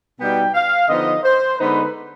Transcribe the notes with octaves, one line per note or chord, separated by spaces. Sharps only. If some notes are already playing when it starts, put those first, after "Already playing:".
B2 G3 B3 D#4 G5
F5
D3 F3 B3 D#4 D#5
C5
D3 G#3 B3 D#4 B4